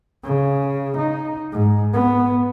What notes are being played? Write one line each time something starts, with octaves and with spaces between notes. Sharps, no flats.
C#3
D#4
G#2
B3